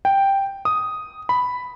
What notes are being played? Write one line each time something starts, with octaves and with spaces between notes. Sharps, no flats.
G5
D#6
B5